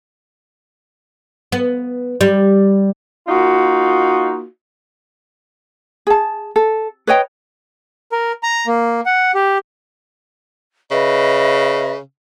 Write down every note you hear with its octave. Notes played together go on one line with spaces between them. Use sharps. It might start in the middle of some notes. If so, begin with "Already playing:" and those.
B3
G3
A#3 D#4 F4 F#4
G#4 A5
A4
B4 C#5 D#5 G5
A#4
A#5
A#3
F#5
G4
C#3 B4 D#5 E5